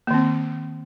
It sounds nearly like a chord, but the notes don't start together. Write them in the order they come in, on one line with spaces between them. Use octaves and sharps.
A#3 D#3 C4